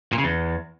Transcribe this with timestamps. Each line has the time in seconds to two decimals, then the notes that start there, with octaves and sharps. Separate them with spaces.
0.13 A#2
0.18 C#3
0.24 E2